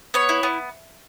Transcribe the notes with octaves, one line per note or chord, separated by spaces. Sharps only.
B3 C#5
E4
B3